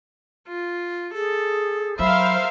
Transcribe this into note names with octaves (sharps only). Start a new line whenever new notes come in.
F4
G#4 A4
F#3 A#4 C5 E5 F5 B5